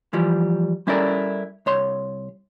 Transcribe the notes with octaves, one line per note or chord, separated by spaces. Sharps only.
E3 F3 G3
G3 C#4 E4 A4 A#4 D5
C2 C#5 C6